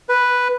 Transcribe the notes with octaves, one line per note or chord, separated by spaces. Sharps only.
B4